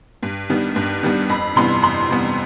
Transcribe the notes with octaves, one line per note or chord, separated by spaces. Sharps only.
G2
D#3 G3 B3
G2
D#3 G3 B3
F2 B5
C3 E3 G3 B3 C6
F2 C6
C3 E3 G3 B3